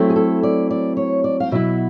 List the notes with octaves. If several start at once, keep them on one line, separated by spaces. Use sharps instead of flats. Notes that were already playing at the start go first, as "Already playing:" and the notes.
Already playing: F#3 A3 C4 E4
G#4
A4
D5
D5
C#5
D5
F5
B2 F#3 B3 E4 E5